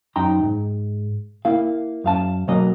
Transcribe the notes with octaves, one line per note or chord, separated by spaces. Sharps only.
F#2 D#4 G5 A#5 C6
G#2
A#3 E4 F5
F#2 F5 A5
B1 F#3 A#3 D#5